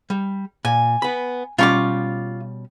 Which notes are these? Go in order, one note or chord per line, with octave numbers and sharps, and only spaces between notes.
G3
A#2 G#5
B3 B5
B2 G3 C#4 F4 C#6 D6